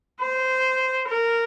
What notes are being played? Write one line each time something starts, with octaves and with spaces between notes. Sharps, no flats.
C5
A#4